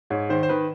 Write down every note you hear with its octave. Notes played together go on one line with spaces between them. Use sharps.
G#2 C#5
D#3 C5
C5
D#3 B4